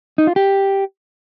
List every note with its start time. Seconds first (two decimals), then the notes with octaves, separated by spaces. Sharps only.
0.18 D#4
0.27 F4
0.36 G4